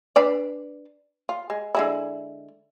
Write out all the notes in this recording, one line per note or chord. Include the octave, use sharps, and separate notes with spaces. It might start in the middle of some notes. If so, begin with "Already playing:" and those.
D4 B4 D5
F4
G#3
D3 G#3 E4